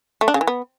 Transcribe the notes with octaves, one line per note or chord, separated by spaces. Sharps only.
A3
D4
C#3
E3
B3